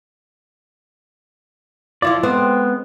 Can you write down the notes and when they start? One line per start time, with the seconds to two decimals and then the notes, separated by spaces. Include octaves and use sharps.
2.02 F3 E4 F4 D5
2.23 G#3 B3 C4